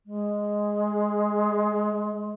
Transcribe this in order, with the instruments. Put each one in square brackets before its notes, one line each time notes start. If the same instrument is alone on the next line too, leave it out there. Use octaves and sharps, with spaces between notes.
[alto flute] G#3